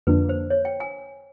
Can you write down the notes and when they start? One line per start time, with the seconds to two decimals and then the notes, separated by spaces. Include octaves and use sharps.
0.07 F2 D3 F3 A#3 D4 B4
0.29 C5
0.50 C#5
0.65 G5
0.80 G#5